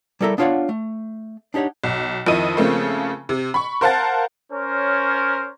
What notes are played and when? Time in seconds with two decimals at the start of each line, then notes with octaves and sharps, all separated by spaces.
0.21 G3 E4 A4 A#4 E5
0.38 B3 D4 F4 C#5 F5 F#5
0.69 A3
1.54 D4 D#4 G4 C#5 F#5
1.84 B1
2.26 F2 D#3 E4 D#5 D#7
2.57 C#3 F3 A3 A#3 C4
3.29 C3
3.54 B5 C#6
3.81 A#4 C5 F5 F#5 A5 A6
4.52 C#4 A#4 C5 C#5